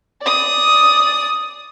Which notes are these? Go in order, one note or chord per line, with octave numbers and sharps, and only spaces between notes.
D5 D#6